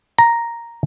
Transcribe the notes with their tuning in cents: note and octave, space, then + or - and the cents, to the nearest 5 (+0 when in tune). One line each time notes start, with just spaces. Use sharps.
A#5 +0